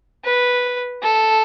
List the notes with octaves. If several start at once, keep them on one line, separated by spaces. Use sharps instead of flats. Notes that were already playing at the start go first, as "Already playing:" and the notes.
B4
A4